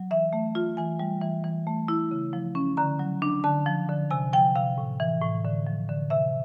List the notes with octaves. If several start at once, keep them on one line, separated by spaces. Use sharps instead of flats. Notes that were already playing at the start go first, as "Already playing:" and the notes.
Already playing: F#3
E3 E5
A3
F4
E3 G#5
G3
E3
E3
A3
E4
C#3
F3
C#4
D3 A#5
F#3
D4
D3 A5
F3
D3
C3 G#5
F3 G5
C3 F5
A2
E3
A2
D3
F3
D3
C3 E5